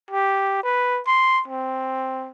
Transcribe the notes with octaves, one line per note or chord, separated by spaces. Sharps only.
G4
B4
C6
C4